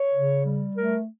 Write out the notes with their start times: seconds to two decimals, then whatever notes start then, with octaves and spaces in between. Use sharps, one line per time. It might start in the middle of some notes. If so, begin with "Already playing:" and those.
Already playing: C#5
0.14 C#3
0.46 G3
0.76 A3 A#4